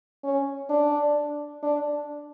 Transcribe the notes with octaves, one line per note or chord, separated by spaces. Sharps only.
C#4
D4
D4